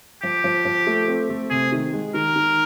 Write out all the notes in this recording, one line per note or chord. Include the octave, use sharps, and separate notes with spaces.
F3 G4
F3
F3
A3
C4
A3
C3 G#4
D#3
G#3
D#3 A#4
D#3